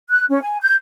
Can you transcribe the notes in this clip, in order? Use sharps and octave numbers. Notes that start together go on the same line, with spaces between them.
F#6
C#4
G#5
G6